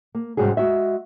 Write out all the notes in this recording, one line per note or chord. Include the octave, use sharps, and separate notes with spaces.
A#3
G#2 C3 G3 C#4 F#4 G#4
G#3 F#4 E5